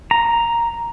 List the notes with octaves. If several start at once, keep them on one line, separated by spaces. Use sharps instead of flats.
A#5